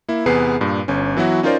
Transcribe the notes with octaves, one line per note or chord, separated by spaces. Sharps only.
A#3 E4
E2 C3 B3 G#4 B4 C7
G2 A#2
G1 C#4
E3 F#3 B3 E4 F#4
C#4 D#4 F4 A#4 C5 D5